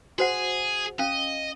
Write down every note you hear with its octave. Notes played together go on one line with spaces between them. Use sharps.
F#4 G#4 C5 F#5
C#4 D#5 F5